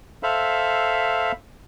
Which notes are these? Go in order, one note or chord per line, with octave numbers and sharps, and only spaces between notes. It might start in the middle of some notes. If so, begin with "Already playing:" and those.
A4 C5 E5 F5 B5